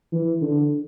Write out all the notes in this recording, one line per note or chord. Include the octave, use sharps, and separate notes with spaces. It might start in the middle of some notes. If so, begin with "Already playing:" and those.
E3
D3